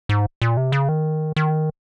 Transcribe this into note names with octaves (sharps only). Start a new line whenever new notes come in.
G#2
A#2
C3
C#3
D#3
D#3